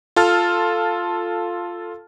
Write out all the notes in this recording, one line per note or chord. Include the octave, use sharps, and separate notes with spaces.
F4 A4 A5 F6